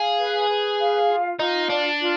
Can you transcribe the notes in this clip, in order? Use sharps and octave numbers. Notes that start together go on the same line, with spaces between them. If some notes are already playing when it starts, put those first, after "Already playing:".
Already playing: G#4 F5
B4
B4
F5
F4
D#4 F4
D4 D5
F4